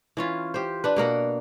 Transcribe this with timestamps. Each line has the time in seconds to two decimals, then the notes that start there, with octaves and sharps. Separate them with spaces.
0.17 E3 C#4 F4
0.54 G4 C5
0.84 D4 B4
0.96 B2 A#3 A#4 F#5